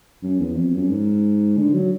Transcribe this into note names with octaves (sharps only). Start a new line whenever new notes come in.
F#2
E2
F2
F#2
G#2
D3
F#3